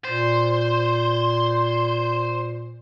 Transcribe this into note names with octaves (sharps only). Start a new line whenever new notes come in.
A#2 C5